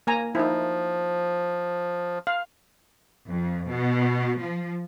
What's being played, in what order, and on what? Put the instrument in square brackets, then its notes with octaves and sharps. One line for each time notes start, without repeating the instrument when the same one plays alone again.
[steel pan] A#3 G#5 A#5
[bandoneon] F3 [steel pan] D#4 E4
[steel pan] F5
[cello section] F2
B2
F3